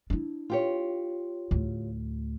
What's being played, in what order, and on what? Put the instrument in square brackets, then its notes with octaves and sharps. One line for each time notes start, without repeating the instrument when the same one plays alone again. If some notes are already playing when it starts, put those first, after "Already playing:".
[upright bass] D4 E4
[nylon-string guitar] F4 G4 C#5
[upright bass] D2 A2